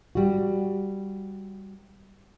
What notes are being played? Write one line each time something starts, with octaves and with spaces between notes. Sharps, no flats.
G3 F#4